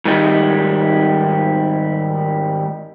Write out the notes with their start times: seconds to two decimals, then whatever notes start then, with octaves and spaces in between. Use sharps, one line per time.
0.05 G#2 D#3 G3 G#3